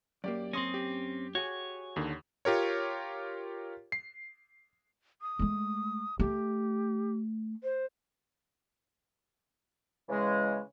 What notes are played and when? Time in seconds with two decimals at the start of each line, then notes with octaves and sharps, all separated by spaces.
0.24 F#2 A#3 G4 D5
0.53 C4 C#4 C6 D#6 A#6
0.74 G4
1.35 F#4 G#4 C#5
1.96 D#2 D3 D#3
2.45 F4 G4 A#4 C#5
3.92 C7
5.22 D#6
5.39 G#3 A3
6.20 A3 G4
7.63 C5
10.09 C#3 E3 G#3